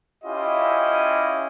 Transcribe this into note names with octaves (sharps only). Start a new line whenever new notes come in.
C#4 E4 F4 G4 D#5